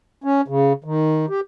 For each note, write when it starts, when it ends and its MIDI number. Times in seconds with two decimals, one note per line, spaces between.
0.24 0.41 61
0.48 0.73 49
0.84 1.26 51
1.29 1.40 67